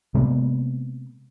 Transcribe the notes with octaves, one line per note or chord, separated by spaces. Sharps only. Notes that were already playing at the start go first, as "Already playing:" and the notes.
C3 G#3 A#3 B3